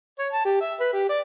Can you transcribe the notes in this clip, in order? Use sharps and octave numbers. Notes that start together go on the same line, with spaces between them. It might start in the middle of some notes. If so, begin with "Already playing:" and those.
C#5
A5
G4
E5
B4
G4
D5